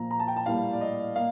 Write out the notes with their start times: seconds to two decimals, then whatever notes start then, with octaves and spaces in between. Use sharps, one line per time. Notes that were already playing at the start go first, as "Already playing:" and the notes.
Already playing: A#2 F3 A#3 A#5
0.11 A#5
0.19 A5
0.28 G5
0.36 A5
0.46 A2 G3 A#3 F5
0.73 D5
0.81 D#5
1.16 A#3 F5